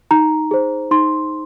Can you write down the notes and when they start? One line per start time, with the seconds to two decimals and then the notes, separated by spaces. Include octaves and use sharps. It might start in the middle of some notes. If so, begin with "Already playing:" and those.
0.11 D#4 A#5
0.51 G#4 C5
0.91 D#4 C6